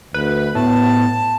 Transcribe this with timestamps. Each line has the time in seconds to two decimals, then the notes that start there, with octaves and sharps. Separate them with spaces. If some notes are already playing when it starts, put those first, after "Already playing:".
0.14 D2 B4
0.55 A2 B3 A5